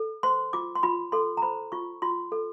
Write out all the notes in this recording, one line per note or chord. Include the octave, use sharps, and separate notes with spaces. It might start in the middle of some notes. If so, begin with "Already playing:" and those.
Already playing: A4
C5 C6
F4 D6
C6
F4 B5
A4 C6
A#5
C5 B5
F4 C#6
F4 C6
A4